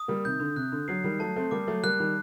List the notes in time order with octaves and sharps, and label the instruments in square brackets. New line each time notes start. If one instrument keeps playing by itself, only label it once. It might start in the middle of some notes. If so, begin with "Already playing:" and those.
Already playing: [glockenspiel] D#6
[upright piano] G3 A#3
[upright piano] C3 D#3 [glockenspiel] G6
[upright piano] D3
[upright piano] C3 [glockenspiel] F#6
[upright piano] D3
[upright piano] D3 F#3 [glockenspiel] C7
[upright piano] D#3 G3
[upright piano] F#3 A3 [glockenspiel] A5
[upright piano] A3 C4
[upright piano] G3 A#3 [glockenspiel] D6
[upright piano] F#3 A3
[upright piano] G3 A#3 [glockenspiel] F#6
[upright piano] D#3 G3